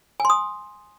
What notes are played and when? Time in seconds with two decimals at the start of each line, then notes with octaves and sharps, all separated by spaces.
0.20 G#5
0.25 C6
0.30 D#6